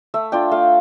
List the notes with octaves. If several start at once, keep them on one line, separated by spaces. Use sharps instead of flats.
A3 E5
D4 F4 G5
A3 F5